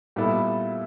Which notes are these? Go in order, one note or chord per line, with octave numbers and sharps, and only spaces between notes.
A#2 G3 B3 E4 A4